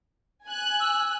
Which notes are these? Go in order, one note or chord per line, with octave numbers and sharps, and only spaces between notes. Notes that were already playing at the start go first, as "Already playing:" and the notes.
G#5 F#6
E6